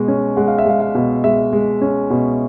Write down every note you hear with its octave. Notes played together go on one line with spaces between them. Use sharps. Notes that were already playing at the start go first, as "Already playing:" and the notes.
Already playing: B2 G#3
C#4
G#3 F#5
F5
E5
G#3 F5
F5
B2
G#3 E5
G#3
C#4
B2